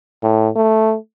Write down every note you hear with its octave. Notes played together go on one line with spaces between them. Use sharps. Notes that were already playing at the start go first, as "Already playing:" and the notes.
A2
A3